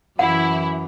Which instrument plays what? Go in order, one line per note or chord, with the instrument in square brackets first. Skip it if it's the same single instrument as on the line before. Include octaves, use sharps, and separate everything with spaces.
[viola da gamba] F#2 E3 [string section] E4 [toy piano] F#5